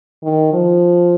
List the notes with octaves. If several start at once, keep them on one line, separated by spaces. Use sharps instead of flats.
D#3
F3